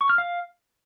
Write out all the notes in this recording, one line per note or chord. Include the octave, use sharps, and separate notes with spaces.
C#6
F6
F5